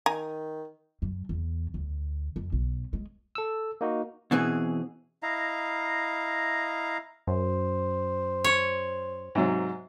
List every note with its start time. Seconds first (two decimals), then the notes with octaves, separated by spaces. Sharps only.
0.06 D#3 G#5 A#5
1.02 F#2
1.29 E2
1.74 D2
2.36 F2
2.52 B1
2.93 G#3
3.35 A4 E6
3.81 A#3 D#4 F#4
4.31 B2 E3 C4 G#4
5.23 E4 D#5 F5 A#5
7.27 F#2 C5
8.44 C#5
9.35 G#2 C3 F#3